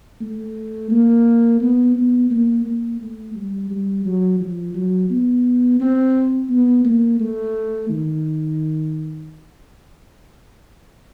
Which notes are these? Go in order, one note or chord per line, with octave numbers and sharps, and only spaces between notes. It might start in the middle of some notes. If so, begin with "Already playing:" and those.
A3
A#3
B3
B3
A#3
A#3
A3
G3
G3
F#3
F3
F#3
B3
C4
B3
A#3
A3
D#3